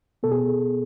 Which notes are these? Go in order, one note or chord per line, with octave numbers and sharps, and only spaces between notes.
B2 B3 A4
G#4